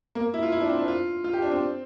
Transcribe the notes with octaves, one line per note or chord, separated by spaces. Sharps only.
A#3
E4
F4
E4
D4
C4
D4
F4
F4
G4
D4
C4